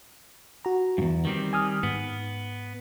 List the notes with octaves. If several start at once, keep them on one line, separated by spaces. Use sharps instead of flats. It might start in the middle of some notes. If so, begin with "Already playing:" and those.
F#4 A#5
E2 G2
D#3 G3 C4
G#5 D#6 F6
G#2 B3